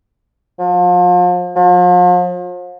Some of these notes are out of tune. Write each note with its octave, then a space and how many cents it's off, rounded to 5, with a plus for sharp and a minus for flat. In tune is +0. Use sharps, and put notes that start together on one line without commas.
F3 +35
F3 +40